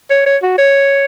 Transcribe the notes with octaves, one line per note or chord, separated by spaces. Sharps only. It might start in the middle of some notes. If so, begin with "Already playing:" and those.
C#5
C#5
F#4
C#5